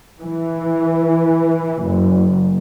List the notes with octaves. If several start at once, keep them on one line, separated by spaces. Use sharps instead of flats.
E3
F#1